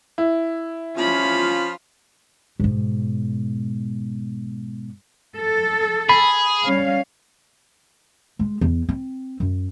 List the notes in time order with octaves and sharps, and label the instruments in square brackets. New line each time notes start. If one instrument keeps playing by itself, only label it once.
[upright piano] E4
[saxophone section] F3 F4 [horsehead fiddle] C#4 B5
[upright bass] G#2 B2
[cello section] A4
[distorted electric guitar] G#4 [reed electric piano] B5
[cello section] G3 C#4 F5
[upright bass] G#3
E2
C4
F#2